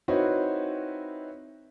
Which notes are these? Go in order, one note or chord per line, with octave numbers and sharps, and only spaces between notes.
C4 D#4 E4 F#4 B4 C#5